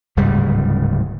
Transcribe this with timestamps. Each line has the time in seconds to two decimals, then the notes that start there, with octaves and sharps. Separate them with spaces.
0.17 D1 G#2 C#3 G3